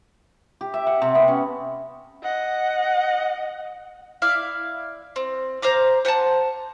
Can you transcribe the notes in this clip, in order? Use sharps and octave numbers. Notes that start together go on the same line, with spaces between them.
G4
E5
F#5
C3
B3
C#4
D#5 F#5
E4 D5 F5
C4
C5 F5 A#5 D6
C5 F#5 G#5 A5